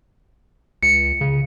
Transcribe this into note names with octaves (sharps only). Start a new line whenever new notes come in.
C#2 C#7
C#3